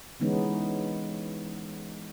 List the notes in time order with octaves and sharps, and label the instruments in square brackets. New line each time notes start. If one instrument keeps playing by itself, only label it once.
[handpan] D3 E3 G#3 B3 C#4 D#4